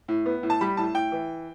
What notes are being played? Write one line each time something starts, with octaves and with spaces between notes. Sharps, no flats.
A2
B3
A2
A5
G3 B5
A2 A5
A2 G5
E3